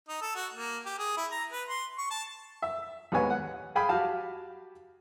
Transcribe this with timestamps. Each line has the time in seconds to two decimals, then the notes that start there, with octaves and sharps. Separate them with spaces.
0.08 D#4
0.21 A4
0.35 F#4
0.54 A#3
0.86 G4
0.99 G#4
1.17 E4
1.32 A#5
1.52 B4
1.68 C6
1.98 C#6
2.11 A5
2.62 E5
3.12 D#2 G#2 B3 C#5 G#5
3.30 F#5
3.75 G#4 F5 G5 G#5 B5
3.89 F#4 G4 F5 A5